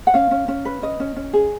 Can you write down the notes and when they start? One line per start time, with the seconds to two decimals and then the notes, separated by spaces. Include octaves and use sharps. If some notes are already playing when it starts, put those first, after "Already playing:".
0.07 F#5
0.14 C#4 F5
0.31 C#4
0.48 C#4
0.65 B4
0.82 C#4 D#5
1.00 C#4
1.16 C#4
1.33 G#4